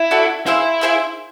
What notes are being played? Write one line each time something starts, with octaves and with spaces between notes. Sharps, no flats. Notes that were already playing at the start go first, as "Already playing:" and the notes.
Already playing: E4
F#4 A4 D5
E4 F4 G#4 C5 E5
F4 G#4 C5 E5